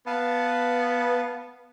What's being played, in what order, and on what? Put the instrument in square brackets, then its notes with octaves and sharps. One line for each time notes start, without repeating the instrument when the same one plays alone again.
[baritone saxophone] B3 [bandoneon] B4 F5 A5